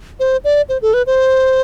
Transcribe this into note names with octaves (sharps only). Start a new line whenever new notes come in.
C5
D5
C5
A4
B4
C5